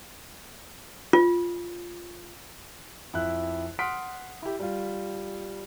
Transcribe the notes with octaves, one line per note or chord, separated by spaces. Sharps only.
F4
F2 E4 E5 F#6
F#5 C6 D#6 F6 B6 D7
E4 G4
G3 F4